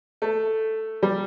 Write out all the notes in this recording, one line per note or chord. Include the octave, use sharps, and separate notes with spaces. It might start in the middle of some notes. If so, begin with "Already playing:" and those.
A3
G3